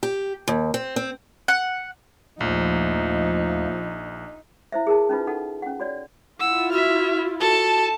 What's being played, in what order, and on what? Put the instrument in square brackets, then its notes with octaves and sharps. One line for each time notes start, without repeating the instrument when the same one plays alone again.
[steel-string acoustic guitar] G4
D#2
C4
C4
[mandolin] F#5
[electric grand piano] A#1 [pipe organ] D#2 A3 A#3 [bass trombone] F3 [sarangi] D#4
[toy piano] E4 C5 E5
G#4 A#4 A5
C#4 D#4 F4 B4
D#4 A4 F#5
C#4 F#5
F#4 C#5 D5
[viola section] E4 F4 [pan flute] F#5 [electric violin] E6
[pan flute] F#4 [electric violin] E5 F6
[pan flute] F#4 [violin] A4 [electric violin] A5